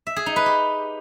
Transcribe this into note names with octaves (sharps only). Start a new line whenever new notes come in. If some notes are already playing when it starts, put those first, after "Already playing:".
E5
G#4
D#4
B4
G4